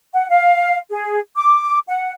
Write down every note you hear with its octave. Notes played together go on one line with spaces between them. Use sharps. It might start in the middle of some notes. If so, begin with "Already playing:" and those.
F#5
F5
G#4
D6
F#5